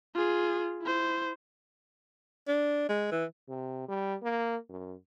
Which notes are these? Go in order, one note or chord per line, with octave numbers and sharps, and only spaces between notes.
F4 G#4
E4 C5
D4
G#3
E3
C3
G3
A#3
F#2